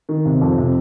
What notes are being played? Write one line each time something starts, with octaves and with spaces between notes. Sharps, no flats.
D#3
C3
F2
C3